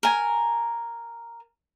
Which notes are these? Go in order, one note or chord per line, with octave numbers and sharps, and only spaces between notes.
A#4 G#5